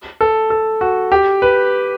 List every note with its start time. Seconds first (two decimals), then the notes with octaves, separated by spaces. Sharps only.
0.21 A4
0.50 A4
0.81 F#4
1.12 G4
1.42 B4